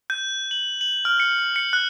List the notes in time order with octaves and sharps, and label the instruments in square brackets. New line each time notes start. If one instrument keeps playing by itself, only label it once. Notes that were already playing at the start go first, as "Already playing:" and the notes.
[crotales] G6
F#7
F#7
F6
C#7
C#7
F#6